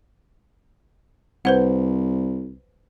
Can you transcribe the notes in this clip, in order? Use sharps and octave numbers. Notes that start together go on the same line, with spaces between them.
C2 B4 C5 F#5